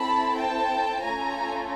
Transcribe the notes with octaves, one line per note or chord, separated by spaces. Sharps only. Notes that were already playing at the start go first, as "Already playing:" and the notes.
Already playing: C4 E4 A4 A5 B5
G5 A5
A3 C#4 F4 A4 G#5 A#5